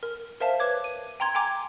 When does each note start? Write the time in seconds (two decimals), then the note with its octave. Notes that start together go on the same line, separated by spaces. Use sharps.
0.03 A#4
0.40 A#4 C5 E5 F5 A5
0.60 B4 C#5 D6 G#6
0.84 D#7
1.20 G5 A#5 C6 G#6
1.35 G5 G#5 A#5 D6 G#6